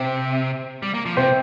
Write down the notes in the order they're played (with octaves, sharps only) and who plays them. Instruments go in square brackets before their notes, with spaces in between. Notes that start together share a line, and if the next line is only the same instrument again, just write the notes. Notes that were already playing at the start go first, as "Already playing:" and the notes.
Already playing: [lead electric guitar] C3 [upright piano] C4 C5
[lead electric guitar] G3
A#3
F3
[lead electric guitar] C3 [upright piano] C4 C5